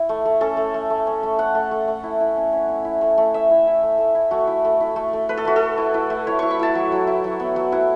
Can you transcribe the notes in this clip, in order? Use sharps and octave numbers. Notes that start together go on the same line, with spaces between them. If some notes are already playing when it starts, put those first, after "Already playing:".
Already playing: E4
A3
A3
C#4 A4
A3
A3
A3
C#4
A3
A3 F#5
A3
A3
A3
E4
E4
C#4
C#4
C#4
E4
A3
A3
A3 E5
E4
E4
A3
A3
E4
A3 F#4
E4
A3
E4
A3
A3
A3 B4
A4
A3 F#4
A4
A3
E4
E4
A3
E4 C#5
E4 C#6
B5
E4 A5
F#3
F#3
E4
F#3
B3
F#3
E4 F#5